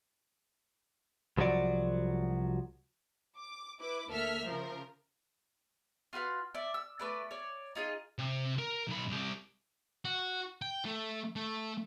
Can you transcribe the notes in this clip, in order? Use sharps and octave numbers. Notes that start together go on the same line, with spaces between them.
C2 F3 F#3 F#4 D5
D6
E4 B4 D6
D2 A#3 A4 E5 F6 B6
C#3 F3 A#4
F4 F#4 B4 F5
D5 E5
E6
A3 B4 D5
C#5 D5
D#4 F4 G#4 D#5
C3
A#4
B1 B5
C2 G4
F#4
G5
A3
A3